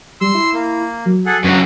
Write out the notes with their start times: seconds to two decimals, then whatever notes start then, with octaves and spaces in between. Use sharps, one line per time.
0.21 G3 C6 E6
0.35 E4
0.54 A#3
1.06 F#3
1.26 G#4 A4 F#5
1.44 F#2 C#3 F#4